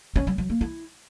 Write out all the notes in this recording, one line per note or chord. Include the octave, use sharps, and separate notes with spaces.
C#4
F#3
F#3
A#3
E4